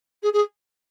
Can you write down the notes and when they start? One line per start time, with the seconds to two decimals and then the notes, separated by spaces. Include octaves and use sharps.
0.23 G#4
0.33 G#4